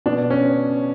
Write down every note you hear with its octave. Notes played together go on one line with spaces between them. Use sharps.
B2 D4
C#4